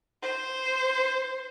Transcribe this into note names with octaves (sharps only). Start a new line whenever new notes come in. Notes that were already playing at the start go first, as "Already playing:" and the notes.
C5